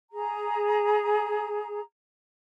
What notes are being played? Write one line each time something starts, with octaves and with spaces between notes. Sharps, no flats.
G#4 A#5